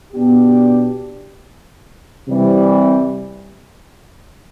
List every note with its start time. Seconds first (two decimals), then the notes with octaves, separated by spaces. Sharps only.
0.12 B2 B3 D4 G4
2.27 C3 E3 G3